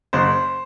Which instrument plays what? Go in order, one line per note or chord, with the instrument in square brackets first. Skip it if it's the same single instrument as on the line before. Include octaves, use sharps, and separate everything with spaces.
[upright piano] F#1 C5